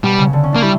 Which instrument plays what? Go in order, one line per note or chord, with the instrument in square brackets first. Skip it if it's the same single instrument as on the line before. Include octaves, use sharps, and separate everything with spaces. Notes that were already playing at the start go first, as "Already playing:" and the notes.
[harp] B2 [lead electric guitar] G3
[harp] C#3
D3
C#4
[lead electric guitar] A#3 [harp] D4
[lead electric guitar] G3 [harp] E4